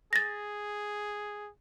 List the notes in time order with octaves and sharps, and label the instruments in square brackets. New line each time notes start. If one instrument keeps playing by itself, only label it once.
[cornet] G#4 [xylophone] A6 A#6